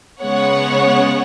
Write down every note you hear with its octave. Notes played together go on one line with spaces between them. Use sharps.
C#3 G#3 B3 C#5 F#5